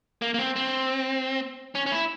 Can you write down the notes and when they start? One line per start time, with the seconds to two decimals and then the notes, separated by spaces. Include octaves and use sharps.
0.22 A#3
0.34 A#3
0.38 C4
0.56 C4
1.75 C#4
1.86 C#4
1.92 E4